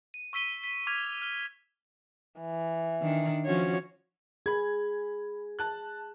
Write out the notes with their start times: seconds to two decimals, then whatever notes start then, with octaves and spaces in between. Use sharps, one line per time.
0.14 D#7
0.33 C#6 E6 B6 D#7 G7
0.64 B6
0.87 C#6 D6 F6 G#6 B6 F7
1.22 F6 G7
2.41 E3
3.01 D#3 D4
3.46 F3 C#4 F#4 C#5
4.46 G#4 B5 G#6
5.59 A5 F#6